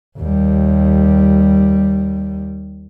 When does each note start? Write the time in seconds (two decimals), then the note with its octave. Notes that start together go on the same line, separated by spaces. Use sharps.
0.18 D#2 G3